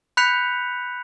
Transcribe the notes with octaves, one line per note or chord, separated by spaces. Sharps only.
B5 F#6 G6 B6 C#7 F7